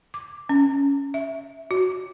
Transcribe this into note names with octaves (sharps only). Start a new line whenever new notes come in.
D6
C#4
E5
F#4